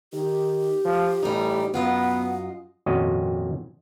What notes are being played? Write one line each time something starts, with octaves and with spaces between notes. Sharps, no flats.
D#3 G4
F3
A1 G3 D#4
F#2 B3 F4 D#5 F#5
G#1 F2 A#2 C#4 F#4 D#5